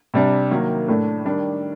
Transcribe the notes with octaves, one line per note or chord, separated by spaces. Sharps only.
C3 G3 D4
D#3 F#3 A#3
A2 A3 D4
D#3 G3 D4